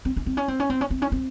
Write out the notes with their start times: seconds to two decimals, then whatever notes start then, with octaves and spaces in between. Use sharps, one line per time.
0.05 C4
0.17 C#4
0.26 C4
0.37 C#4
0.48 C4
0.60 C#4
0.70 C4
0.81 C#4
0.90 C4
1.02 C#4
1.12 C4